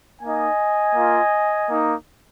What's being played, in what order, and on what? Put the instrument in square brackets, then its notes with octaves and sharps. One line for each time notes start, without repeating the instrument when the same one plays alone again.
[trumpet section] A#3 D#4 D#5 G#5
A#3 F4
A#3 D#4